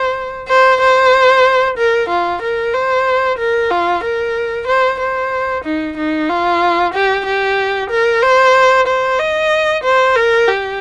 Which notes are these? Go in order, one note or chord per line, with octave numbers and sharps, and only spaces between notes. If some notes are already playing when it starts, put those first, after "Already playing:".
Already playing: C5
C5
C5
A#4
F4
A#4
C5
A#4
F4
A#4
C5
C5
D#4
D#4
F4
G4
G4
A#4
C5
C5
D#5
C5
A#4
G4